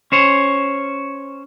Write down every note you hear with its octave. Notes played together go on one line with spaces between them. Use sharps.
C#4 C5 C#5